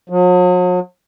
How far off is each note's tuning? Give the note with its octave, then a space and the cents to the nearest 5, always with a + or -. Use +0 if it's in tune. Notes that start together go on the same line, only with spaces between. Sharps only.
F#3 -45